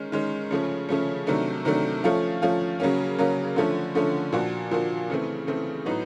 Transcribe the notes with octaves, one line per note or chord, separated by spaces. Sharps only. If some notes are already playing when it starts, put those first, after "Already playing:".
Already playing: D#3 G#3 C#4
D#3 G#3 C#4
C#3 F3 A3 C#4
C#3 F3 A3 C#4
C3 D#3 F#3 A3 D4
C3 D#3 F#3 A3 D4
F3 A3 C#4 F4
F3 A3 C#4 F4
C#3 F#3 A#3 C#4
C#3 F#3 A#3 C#4
D3 F3 A3 C#4
D3 F3 A3 C#4
A#2 F3 A#3 D4 F#4
A#2 F3 A#3 D4 F#4
C#3 E3 A3 C4
C#3 E3 A3 C4
A2 F#3 B3 D#4